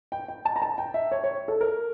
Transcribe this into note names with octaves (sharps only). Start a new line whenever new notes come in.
G5
G5
A5
A#5
A5
G5
E5
C#5
C#5
A4
A#4